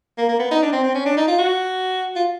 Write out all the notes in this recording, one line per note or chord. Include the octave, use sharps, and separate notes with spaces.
A#3
A#3
B3
D#4
D4
C4
C4
C#4
D4
D#4
F4
F#4
F4